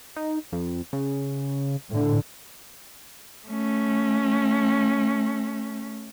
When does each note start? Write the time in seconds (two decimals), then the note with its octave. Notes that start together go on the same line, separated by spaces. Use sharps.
0.16 D#4
0.52 F2
0.93 C#3
1.90 A2 D3
3.47 A3 C#4